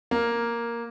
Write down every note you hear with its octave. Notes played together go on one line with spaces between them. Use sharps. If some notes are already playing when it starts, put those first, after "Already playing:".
A#3